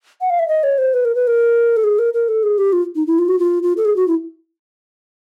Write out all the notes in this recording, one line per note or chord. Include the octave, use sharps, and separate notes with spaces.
F#5
F5
E5
D#5
C#5
C5
B4
A#4
B4
A#4
A4
G#4
A#4
A#4
A4
G#4
G4
F4
D#4
E4
F4
F#4
F4
F4
A4
G#4
F#4
E4